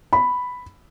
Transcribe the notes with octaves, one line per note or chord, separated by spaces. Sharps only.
B5